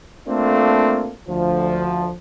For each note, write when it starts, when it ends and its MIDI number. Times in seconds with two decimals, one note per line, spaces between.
0.28 1.13 57
0.28 1.13 58
0.28 1.13 60
0.28 1.13 62
0.28 1.13 65
0.28 1.13 69
1.29 2.13 38
1.29 2.13 53